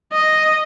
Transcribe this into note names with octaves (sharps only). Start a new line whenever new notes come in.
D#5